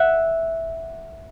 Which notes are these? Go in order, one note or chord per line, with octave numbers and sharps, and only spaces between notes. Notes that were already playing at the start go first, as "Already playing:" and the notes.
Already playing: E5 F#5